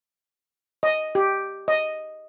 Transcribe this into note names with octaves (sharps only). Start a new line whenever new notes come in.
D#5
G4
D#5